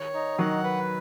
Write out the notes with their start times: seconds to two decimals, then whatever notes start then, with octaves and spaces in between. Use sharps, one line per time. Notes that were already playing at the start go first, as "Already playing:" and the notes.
Already playing: D#3 C#5
0.14 D#4
0.38 D#3 F#3 F#5
0.64 B4